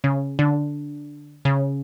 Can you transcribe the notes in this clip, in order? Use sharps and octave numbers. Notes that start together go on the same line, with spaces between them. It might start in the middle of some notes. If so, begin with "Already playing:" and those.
C#3
D3
C#3